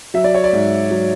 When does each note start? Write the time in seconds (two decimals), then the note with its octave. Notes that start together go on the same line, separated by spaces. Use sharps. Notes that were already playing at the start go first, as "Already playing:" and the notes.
0.14 F#3 E5
0.24 D5
0.34 C#5
0.44 D5
0.53 G#2
0.91 F#3